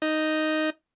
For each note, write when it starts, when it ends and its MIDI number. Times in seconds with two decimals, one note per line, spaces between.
0.02 0.70 63